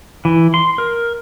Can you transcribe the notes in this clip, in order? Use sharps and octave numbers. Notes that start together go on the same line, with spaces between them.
E3
C6
A#4